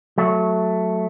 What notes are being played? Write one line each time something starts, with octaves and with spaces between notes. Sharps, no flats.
F#3 A3